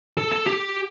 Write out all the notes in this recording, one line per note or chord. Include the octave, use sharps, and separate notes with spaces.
A4
A4
G4